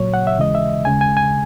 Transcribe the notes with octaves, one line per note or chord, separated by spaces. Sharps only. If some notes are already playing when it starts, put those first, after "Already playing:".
Already playing: A#2 F#3 C#5
F#5
E5
D#2 C#3 E3 G#3 D#5
E5
D#2 C#3 G#3 G#5
G#5
G#5